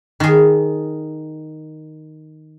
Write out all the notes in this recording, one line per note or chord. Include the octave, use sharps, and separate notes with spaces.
D#3 G#4